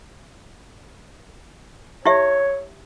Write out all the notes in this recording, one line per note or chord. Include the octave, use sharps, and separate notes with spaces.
E4 G4 C#5 E5